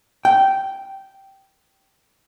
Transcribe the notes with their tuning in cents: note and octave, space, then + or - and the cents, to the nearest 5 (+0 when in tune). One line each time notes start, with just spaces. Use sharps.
G5 -10